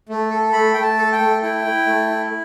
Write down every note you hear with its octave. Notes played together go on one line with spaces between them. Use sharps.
A3
A4
A3 B5
A3 G5
A5
A4
G5
A3
E4 G5
E4
A3
E4